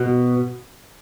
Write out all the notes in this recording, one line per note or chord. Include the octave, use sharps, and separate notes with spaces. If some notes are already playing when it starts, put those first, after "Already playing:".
Already playing: B2